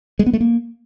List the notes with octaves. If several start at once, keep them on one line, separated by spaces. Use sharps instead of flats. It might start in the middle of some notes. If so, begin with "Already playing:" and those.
G#3
B3
A3
A#3